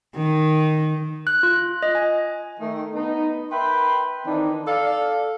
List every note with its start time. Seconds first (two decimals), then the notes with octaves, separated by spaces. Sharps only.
0.16 D#3
1.27 F#6
1.43 F4
1.83 D#5
1.95 G#5
2.60 D#3 A3
2.93 B3 D#4
3.51 A#4 B4 E5 G5 B5 C6
4.26 D#3 E3 C4 D4 D#4
4.66 A4 D5 F5